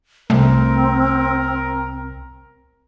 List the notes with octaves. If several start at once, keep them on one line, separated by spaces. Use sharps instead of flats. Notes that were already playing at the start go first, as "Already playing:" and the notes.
C2 A3 C4 A#4